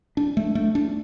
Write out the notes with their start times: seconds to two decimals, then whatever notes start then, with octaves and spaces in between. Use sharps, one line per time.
0.17 D4
0.37 A3
0.55 A3
0.75 D4